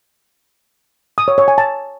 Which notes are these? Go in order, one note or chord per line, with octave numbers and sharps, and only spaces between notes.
D#6
C#5
C#5
G#5
A5